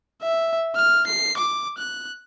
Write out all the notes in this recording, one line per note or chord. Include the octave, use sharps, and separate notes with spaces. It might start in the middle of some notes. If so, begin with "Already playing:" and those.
E5
F6
C7
D6
F#6